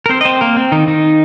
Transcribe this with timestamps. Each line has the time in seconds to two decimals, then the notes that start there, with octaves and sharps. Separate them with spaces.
0.06 A#4
0.09 C4 C5
0.21 D#5
0.25 C4 C5
0.41 A#3 A#4
0.57 C4
0.72 D#3 D#4
0.88 D#3 D#4